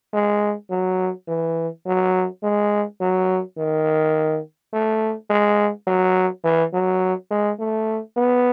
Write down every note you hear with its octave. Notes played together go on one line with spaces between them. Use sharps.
G#3
F#3
E3
F#3
G#3
F#3
D#3
A3
G#3
F#3
E3
F#3
G#3
A3
B3